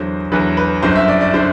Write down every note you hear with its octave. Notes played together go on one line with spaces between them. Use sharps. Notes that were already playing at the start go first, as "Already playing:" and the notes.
Already playing: E2 D3 F#3 C5
E2 D3 F#3 B4
B4
G1 F#2 D3 C5
E5
D5
D5
D3 C5